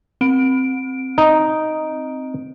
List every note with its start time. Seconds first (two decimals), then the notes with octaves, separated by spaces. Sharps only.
0.21 C4 D7
1.18 D#4